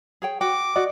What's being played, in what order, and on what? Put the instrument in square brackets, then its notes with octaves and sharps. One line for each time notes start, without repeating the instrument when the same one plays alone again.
[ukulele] G#4 C#5 G5
[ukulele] F#4 G5 [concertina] D6
[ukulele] F#4 [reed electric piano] D5 D#5